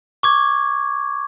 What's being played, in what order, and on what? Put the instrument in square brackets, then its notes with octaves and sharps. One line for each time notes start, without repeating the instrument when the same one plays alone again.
[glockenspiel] C#6 D6 G#6